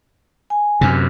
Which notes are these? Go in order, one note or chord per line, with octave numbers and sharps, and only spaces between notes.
G#5
F#2 C3